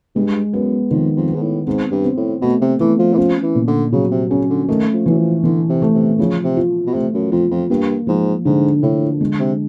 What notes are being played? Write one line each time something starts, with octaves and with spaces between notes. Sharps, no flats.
G2 G#3
F#2 B3
F2 D#3
F2
B3
G#2
A2
G#2 C4
G2
C4
A2
B2 A3
C3
E3 A3
F3
E3
F3 C#4
E3
A#2
D3
C#3 F#3
C3
C#3 C#4
D3
D#3 A3
F3
E3 F#3
F3
D3 E3
C3
A3
C3
C#3 F3
C3
F4
B2
C3 A3
F#2
F2 F4
F2
G2 A#3
G#2 F3
G#2 D3
A2 D3
G#3
C3